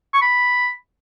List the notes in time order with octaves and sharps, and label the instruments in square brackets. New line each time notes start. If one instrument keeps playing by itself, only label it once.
[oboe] C#6
B5